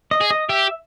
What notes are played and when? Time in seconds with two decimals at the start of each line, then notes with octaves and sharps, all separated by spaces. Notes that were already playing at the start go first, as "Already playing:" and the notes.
0.11 D#5
0.21 G#4
0.31 D#5
0.49 G4 E5